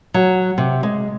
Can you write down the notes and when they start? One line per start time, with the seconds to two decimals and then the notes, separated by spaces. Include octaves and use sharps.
0.14 F#3
0.58 C3
0.83 G#3